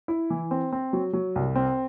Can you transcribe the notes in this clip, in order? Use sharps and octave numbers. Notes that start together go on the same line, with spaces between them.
E4
E3
C4
C4
F#3
F#3
C2
C4